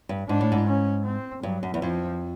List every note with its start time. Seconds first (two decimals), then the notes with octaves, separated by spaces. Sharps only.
0.09 G2
0.29 G#2 D4
0.41 A2
0.52 G#2
0.68 C#4
1.05 C4
1.43 G2 F#3
1.63 F#2
1.74 E2
1.81 F2 F3